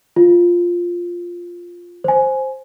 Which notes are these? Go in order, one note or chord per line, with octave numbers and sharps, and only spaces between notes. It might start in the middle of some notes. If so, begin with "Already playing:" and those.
F4
C5 G#5